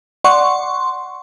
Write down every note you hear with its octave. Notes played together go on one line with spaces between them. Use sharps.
D5 F#5 C6 C#6